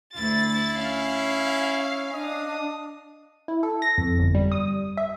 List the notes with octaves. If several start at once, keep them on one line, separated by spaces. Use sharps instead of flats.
D2 E4 A6
C#4 F5
D4 D#5 D#6
E4
A4
A#6
F2
G1
G3
D#6
E5